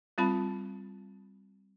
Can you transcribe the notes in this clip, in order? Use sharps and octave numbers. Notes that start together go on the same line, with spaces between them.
G3 C4 F4 A5 B5